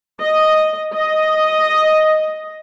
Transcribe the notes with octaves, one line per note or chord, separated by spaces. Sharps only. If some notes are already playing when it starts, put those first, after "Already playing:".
D#5
D#5